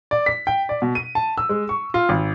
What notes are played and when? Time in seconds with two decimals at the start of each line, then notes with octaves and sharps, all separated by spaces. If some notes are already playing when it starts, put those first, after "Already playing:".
0.11 D5
0.26 B6
0.47 G5
0.69 D5
0.82 B2
0.95 D#7
1.15 A5
1.38 E6
1.49 G#3
1.69 C#6
1.94 F4
2.09 G#1